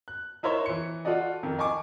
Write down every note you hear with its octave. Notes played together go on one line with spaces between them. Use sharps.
F#6
D#4 E4 A#4 C5 C#5
E3 C#7
F4 F#4 A4 D5 D#5
F2 D#3
D#5 G#5 A5 C#6 D6